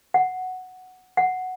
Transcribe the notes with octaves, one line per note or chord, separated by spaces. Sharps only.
F#5
F#5